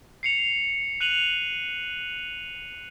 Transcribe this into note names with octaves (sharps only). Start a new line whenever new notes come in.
C7 C#7 F7
F#6 D#7 F7 F#7